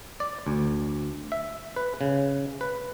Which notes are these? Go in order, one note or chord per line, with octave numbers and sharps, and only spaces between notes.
D5
D2
E5
B4
C#3
B4